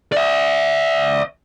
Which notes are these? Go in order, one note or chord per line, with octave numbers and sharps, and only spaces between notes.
D5 E5